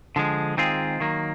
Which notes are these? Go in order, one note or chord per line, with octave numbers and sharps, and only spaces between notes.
D3 F3 G#3
D#3 G#3 C4 F4 G#4
D#3 F#3 A#3